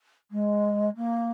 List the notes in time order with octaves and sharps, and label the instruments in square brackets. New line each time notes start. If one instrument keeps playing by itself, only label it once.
[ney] G#3
A#3